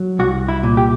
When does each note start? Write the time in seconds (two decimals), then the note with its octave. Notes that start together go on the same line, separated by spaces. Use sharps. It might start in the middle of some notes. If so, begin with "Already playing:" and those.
Already playing: F#3
0.19 C2 F#4
0.48 E4
0.63 A#2
0.77 G4